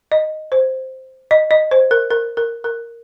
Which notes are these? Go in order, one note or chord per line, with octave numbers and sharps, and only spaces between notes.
D#5
C5
D#5
D#5
C5
A#4
A#4
A#4
A#4